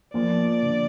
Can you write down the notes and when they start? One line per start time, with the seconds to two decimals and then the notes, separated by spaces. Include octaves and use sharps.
0.14 F3 A#3 D5
0.62 D3